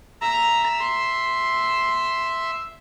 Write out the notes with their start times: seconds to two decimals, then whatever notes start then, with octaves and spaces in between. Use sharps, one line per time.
0.22 E5 A#5
0.79 C6